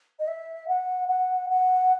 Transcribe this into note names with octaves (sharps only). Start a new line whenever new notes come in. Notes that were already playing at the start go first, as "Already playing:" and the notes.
D#5
E5
F#5
F#5
F#5